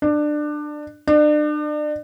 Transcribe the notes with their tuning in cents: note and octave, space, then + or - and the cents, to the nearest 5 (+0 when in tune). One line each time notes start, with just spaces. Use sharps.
D4 +20
D4 +35